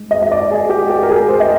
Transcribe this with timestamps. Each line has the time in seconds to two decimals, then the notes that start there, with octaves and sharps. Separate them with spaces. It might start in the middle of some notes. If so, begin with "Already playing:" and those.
Already playing: G#2 G#3
0.11 D#5
0.22 D#5
0.32 D5
0.51 G#4
0.70 G4
0.90 G4
1.03 A#4
1.10 G#4
1.29 C5
1.40 D#5